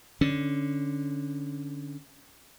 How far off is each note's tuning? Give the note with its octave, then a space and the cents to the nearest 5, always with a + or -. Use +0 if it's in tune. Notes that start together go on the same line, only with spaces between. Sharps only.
D3 +0 C#4 +0